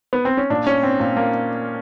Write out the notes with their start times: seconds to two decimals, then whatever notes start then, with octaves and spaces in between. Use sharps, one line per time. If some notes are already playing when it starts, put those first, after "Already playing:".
0.13 B3
0.25 C4
0.37 C#4
0.50 A#2 D4
0.67 C#4
0.83 C4
1.00 A#2
1.17 A#3